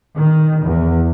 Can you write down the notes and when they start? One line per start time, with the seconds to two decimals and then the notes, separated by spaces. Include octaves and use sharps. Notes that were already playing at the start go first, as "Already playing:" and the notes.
0.19 D#3
0.64 E2